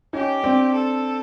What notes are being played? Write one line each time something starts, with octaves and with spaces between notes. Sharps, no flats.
C#4 D#4 G4
C4 D4
A4